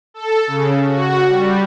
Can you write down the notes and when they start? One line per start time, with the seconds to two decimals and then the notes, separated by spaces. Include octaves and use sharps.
0.14 A4
0.47 C#3
0.86 F#4
1.28 G3